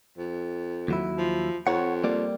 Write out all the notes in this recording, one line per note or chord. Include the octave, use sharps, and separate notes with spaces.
F2
D#2 F#3 E4
F3
F2 C#5 F#5
G3 A#3 D5